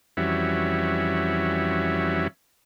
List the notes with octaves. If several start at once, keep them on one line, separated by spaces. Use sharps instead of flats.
F2 E3 G3 C#4 F#4 E5